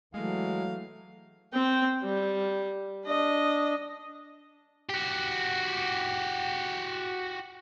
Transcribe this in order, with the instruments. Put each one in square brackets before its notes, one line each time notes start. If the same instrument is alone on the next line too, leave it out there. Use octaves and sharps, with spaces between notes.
[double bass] E3 A3 [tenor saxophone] F#3 [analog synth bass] G#3 [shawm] F5
[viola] C4 G5
G3
D4 D#5
[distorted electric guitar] F#4 G4